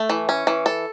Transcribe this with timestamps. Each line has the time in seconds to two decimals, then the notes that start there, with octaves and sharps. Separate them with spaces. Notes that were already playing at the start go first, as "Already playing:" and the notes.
Already playing: A3
0.10 E3
0.29 C#4
0.47 E3
0.66 A4